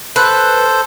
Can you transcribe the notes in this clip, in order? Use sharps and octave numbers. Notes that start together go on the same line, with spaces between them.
A4 B4 C5